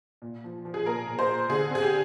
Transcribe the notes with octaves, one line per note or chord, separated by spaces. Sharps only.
A#2
F3
F3
G#4
A#2 A#4
A#2
C5
A#2
D3 G#4
C4 G#4
G4